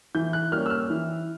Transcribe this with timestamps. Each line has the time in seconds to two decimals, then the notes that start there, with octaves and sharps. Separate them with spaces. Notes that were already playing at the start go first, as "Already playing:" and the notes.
0.15 E3 G6
0.33 F#6
0.52 G3 A#3 C#4 F6
0.66 E6
0.70 F6
0.90 E3